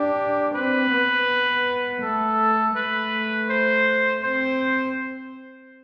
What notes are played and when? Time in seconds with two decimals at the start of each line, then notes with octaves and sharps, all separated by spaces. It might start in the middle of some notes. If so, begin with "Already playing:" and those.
Already playing: D4 G4
0.55 C4 B4
0.92 B3
2.02 A3 A4
2.76 A3 B4
3.50 C5
4.24 C4 C5